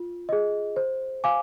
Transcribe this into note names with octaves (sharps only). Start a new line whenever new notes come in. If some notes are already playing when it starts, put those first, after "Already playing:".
Already playing: F4
G#4 D#5
C5
F5 G#5 D6